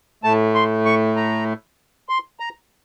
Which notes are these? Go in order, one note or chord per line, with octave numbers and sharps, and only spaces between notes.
A2 A3 A5
C6
C#6
A#5
C6
A#5